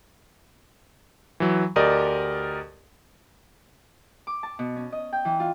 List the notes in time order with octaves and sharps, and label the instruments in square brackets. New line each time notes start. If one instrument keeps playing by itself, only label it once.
[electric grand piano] E3 F#3
D2 G4 A#4 D5 D#5 D#6
[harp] D6
A5
B2
C#4
D#5
G5
E3
F4